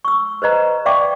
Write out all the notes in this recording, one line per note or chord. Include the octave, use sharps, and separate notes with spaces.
C#6 E6
B4 C5 D#5 A#5
D5 E5 F5 G5 C#6 D6